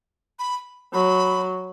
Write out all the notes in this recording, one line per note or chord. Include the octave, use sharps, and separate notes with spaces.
B5
F#3 B5